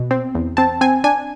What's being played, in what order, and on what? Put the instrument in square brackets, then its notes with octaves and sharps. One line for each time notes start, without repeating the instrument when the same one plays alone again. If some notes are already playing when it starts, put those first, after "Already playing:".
Already playing: [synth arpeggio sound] B2
C4
E2
C4 A5
C4 G#5
D4 G#5